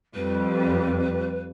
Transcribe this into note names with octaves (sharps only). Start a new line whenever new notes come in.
F2 G3 B4